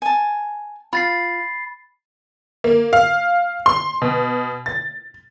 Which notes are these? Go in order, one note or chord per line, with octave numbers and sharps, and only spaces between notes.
G#5 A5
F4 B5 A6 C7
A#3
F5
C6
B2
A6